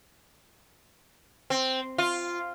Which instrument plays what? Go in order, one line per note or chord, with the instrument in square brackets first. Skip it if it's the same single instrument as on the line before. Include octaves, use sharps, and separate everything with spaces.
[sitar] C4
F4